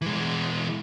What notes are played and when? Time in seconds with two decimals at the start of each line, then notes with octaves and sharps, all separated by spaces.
0.02 E3 G#3